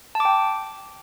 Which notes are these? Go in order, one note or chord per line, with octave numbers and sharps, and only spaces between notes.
A5
D6
G5